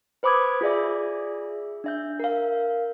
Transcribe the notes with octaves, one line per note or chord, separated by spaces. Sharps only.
B4 C5 B5 D6 D#6 G#6
F4 G#4 D5 E5
D4 E5 G6
A#4 F5